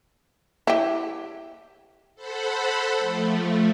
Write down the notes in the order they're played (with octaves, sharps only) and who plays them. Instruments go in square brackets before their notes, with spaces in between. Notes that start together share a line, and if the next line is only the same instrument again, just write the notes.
[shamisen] E4 G4
[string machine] A4 C5 F#5 B5
F3 A3